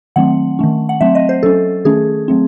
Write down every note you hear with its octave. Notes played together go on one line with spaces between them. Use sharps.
D#3 F#3 A3 C4 F#5
D#3 A3 C#4
F#5
F#3 A3 C4 E5
D#5
C5
F#3 C#4 A4
D#3 A3 C#4 G#4
F#3 A3 C4